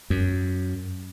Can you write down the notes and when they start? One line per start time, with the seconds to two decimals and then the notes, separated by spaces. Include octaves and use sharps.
0.10 F#2